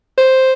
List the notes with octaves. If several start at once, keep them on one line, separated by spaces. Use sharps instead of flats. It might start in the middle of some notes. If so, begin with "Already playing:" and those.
C5